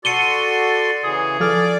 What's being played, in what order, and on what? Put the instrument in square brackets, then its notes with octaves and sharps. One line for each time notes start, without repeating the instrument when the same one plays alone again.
[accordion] F#4 A4 C6 [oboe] D5 [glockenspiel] C#7 D#7 G7
[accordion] C#3 E3 [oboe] G#4
[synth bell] F3 A4 F6 [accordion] D5